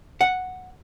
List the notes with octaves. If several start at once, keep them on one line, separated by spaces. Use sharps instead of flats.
F#5